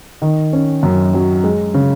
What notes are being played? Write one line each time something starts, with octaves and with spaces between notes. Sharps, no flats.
D#3
C#4
F#2
F#3
G#3
C#3